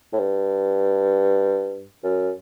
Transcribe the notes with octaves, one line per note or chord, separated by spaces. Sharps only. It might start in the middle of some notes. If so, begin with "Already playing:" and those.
A2
G2
F#2